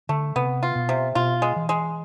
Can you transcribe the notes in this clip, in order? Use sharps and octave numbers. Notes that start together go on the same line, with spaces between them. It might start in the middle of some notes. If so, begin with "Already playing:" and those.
D3 A3
C3 B3
F4
B2
C3
B2 F4
G#3
E3
G#3